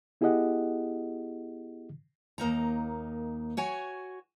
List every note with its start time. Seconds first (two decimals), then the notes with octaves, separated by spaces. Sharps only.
0.21 B3 E4 G4 G#4 D#5 F#5
2.38 D#2 A#3 D#4 A#5
3.57 F#4 C#5 G#5